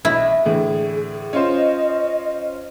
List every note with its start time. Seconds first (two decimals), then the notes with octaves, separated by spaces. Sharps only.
0.05 B1 E4
0.45 A2 D3 E3 G#4
1.33 C#4 F4 C5 D#5